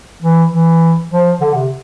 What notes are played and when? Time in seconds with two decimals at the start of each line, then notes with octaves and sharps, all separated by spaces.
0.23 E3
0.52 E3
1.11 F3
1.41 D3
1.55 C3